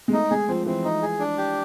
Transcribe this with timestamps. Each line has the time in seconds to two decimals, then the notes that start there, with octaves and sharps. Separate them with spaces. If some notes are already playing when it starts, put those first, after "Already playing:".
0.08 G#3
0.12 A3 D#4
0.31 G#3 G#4
0.48 F3 C4
0.66 E3 C4
0.84 D#4
1.02 G#4
1.19 D4
1.38 G4